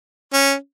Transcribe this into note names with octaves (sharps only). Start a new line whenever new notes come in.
C#4